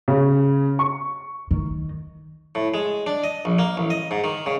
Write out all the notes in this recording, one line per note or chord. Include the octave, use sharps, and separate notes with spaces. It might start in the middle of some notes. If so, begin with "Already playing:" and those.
C#3
C#6
D#3
A2
G#3
D4
D#5
A#1
A#3
A1
D#5
G#2
D#3
C#3